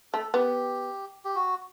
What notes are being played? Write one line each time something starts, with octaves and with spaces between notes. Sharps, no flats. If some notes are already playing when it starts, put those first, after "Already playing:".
A3 A4
B3 G4
G4
F#4